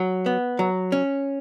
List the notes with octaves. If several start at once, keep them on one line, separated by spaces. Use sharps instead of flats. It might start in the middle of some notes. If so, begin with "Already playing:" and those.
Already playing: F#3
B3
F#3
C#4